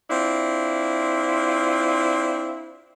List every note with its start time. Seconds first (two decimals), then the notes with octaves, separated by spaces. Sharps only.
0.09 C4 D4 E4 F4